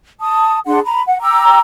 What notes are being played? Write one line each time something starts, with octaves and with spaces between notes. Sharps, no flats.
A5 D#6
D4 G#4 F#5 C6
A#5 B5
F#5
G5 A#5 D6 E6